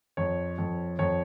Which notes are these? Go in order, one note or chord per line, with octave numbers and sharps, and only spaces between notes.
F2 C#5
F2
F2 C#5